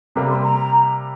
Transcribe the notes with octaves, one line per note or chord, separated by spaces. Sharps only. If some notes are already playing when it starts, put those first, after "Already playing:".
C3 G3 A#3 A#5
C6
A#5